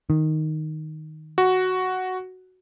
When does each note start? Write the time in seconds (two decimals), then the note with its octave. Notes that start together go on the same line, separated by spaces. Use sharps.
0.10 D#3
1.38 F#4